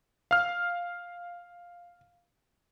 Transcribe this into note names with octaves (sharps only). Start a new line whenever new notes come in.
F5 F6